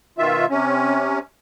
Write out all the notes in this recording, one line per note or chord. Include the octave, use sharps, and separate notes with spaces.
B2 D#3 F4 E5
C3 C#4